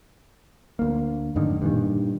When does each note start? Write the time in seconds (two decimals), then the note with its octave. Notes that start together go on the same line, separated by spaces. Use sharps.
0.79 D2 A#3
1.36 F2 G#2 D3 D#3
1.62 G2 A#2 D#3